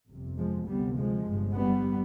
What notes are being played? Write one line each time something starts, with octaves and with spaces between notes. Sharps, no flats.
G1 F2 C3
F3 G#3
D2 C3 G3 B3
F3 G#3
G1 G2
G3 B3